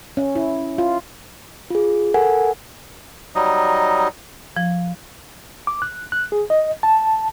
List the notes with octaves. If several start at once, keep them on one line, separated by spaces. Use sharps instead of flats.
C#4
E4
F4
F4 G#4
A4 A#4 F#5 G#5
F#3 G3 D#4 D#5
F3
D6
F#6
F#6
G#4
D#5
A5